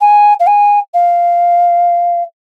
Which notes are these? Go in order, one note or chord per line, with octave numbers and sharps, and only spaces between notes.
G#5
F5
G#5
F5